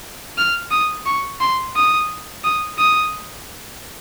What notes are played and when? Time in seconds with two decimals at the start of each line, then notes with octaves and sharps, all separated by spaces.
0.38 F6
0.71 D#6
1.06 C#6
1.41 C6
1.76 D#6
2.44 D#6
2.78 D#6